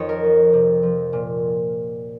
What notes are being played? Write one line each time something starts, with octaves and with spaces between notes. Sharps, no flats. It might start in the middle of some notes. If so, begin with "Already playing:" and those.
Already playing: F2 D#3 C#5 D#5
A#4
F3
C3
F3
A#2